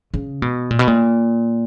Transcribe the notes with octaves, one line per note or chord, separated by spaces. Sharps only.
C#3
B2
A#2
B2
A#2